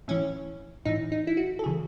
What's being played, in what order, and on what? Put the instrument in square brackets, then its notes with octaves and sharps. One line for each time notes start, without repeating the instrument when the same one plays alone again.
[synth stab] A2 E3 C#4
A2 E3 D#4
D#4
E4
F#4
A4
C#3 E3 G#4